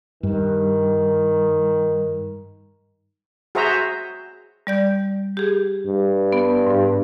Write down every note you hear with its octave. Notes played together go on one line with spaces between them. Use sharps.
G2 D#3
F#4 G#4 C5 E5 A#5
G3 D5 G6
G4 G#4
G2
B3
G#2